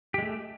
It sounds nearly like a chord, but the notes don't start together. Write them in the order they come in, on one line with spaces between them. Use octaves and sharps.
G4 G#3 A3